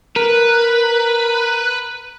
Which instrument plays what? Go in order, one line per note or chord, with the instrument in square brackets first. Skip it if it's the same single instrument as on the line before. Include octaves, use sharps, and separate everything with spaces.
[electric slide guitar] A#4 [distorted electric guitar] B4